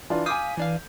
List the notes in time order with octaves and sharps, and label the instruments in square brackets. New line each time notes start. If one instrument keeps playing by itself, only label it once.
[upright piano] E3 D4 F4
[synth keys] F5 D#6 B6 [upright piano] G#5 D6 G6
[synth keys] E3 D4 F5